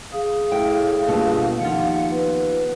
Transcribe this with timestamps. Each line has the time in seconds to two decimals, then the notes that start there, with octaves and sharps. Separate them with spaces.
0.12 G#4 F5
0.52 A2 G5
1.08 G1 B2 A3 A#3
1.61 D#2 F3 F4 F#5
2.11 B3 B4